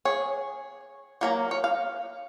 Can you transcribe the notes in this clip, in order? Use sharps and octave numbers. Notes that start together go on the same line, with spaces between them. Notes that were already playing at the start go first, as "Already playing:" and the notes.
G#4 C#5
F#3 A#3 A#5
C#5
F5